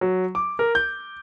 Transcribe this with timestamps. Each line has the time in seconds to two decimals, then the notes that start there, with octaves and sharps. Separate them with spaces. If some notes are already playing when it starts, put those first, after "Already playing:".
0.01 F#3
0.35 D6
0.59 A#4
0.75 G6